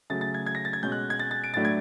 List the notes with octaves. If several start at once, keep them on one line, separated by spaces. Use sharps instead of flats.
C#3 F#3 A3 A6
A6
G#6
G#6
A#6
A6
G#6
B2 G#3 C#4 G6
F#6
G#6
A6
A6
D7
A2 F#3 A3 D4 A6
G#6